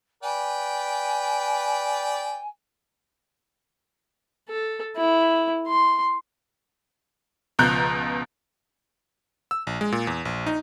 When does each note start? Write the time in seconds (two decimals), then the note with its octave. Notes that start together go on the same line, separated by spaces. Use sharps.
0.23 B4 D5 G5 G#5
4.49 A4
4.97 E4
5.67 C6
7.59 C#2 B2 F3 A#5 F#6 G6
9.51 E6
9.67 A#1
9.81 G#3
9.92 A#2
10.07 E2
10.25 A#1
10.46 D#4